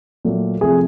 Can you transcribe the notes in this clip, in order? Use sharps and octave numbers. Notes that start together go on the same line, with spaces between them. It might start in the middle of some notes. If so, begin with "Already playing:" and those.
A#2 F#3 A3
C3 F3 A3 G#4